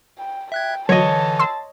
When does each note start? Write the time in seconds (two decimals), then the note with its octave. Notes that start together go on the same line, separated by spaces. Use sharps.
0.19 G5
0.52 E5 G5 F#6 G#6
0.89 D3 E3 F#3 C#5 D#5 A5
1.39 C6 E6